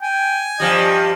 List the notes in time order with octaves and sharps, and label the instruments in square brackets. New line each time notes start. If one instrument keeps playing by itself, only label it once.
[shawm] G5 [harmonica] G#5
[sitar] G2 F3 G3 [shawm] D#5